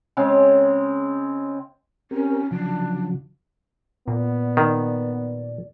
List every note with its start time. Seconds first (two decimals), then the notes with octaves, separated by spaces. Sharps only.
0.17 C#3 G#3 C4
2.11 C4 C#4 G4 A#4
2.51 C#3 F3 F#3 D4
4.08 A#2 B3 D5
4.57 D#3